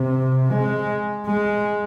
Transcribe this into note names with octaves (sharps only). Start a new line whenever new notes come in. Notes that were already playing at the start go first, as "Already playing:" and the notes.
Already playing: C3
G#3
G#3